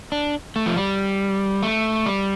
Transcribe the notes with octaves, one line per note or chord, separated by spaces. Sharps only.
D4
A3
F3
G3
A3
G3